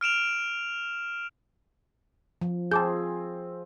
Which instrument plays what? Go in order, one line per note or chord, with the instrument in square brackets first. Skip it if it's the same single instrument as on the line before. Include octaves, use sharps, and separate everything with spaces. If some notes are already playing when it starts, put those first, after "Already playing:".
[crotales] F6 D7 E7 F7
[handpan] F3
[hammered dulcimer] C4 F4 [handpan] G#4 [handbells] A5 D6 G6